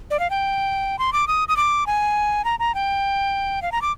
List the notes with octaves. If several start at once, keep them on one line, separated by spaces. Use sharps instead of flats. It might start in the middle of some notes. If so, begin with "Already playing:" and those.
D5
F5
G5
C6
D6
D#6
D#6
D6
G#5
A#5
A#5
G5
F5
A#5
D6